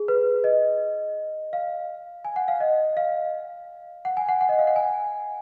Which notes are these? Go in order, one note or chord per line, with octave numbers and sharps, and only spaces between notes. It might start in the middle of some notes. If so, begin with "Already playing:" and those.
Already playing: G#4
B4
D#5
F5
G#5
F#5
F5
D#5
F5
F#5
G#5
F#5
F#5
D#5
F5
F#5
G#5